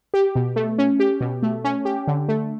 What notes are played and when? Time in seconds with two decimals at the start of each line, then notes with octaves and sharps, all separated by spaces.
0.14 G4
0.35 B2
0.56 A3
0.78 C#4
1.00 G4
1.21 B2
1.43 A3
1.64 C#4
1.85 G4
2.07 D3
2.28 A3